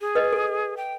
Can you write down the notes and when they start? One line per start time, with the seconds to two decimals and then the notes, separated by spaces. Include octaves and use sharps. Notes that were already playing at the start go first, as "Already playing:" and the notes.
0.01 G#4
0.15 B4 D#5
0.33 A4
0.77 G5